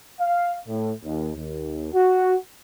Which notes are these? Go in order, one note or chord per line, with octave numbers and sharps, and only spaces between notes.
F5
A2
D#2
D#2
F#4